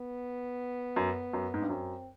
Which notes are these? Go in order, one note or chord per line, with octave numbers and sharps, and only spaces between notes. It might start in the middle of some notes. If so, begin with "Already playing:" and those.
Already playing: B3
F#2
F#2
G#2
G2
F#2 C4